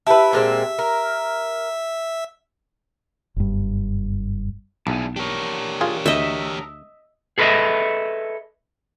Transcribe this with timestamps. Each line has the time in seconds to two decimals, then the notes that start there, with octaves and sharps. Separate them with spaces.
0.07 E4 G4 B4 E5 A5
0.33 A#2 G#3 C4
0.79 A#4
3.36 F#1 G2
4.87 B1 D4 E4 G#4
5.16 D4 G4 A#4 C#5
5.81 F4 G#4
6.06 D2 D#5 E5
7.38 G#4 A4 B4 C5 D#5 E5